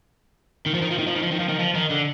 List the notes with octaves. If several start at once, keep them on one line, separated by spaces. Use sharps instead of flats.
D#3
F3
D#3
F3
D#3
F3
D#3
F3
D#3
F3
D#3
F3
D#3
D3